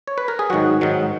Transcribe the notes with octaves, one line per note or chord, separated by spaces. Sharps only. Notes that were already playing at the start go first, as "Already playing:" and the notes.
C#5
B4
A#4
G#4
G#2 D#3 F#3 F#4
G#2 D#3 F#3